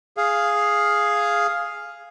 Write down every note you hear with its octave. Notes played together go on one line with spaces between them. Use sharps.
G#4 F5